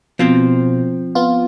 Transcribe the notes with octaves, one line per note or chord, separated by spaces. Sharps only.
B2 F3 C4
B3 F4